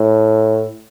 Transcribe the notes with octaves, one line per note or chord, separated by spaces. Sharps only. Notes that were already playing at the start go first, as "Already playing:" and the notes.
Already playing: A2